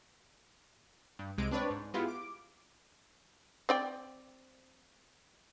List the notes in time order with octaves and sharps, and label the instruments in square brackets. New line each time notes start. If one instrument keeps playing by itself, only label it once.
[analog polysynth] G2
C2 C3 G#3 D7
C4 D4 B4 C#5 D5
G#2
G#3 B3 E4 F4 G4
D6
[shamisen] C4 D5 G5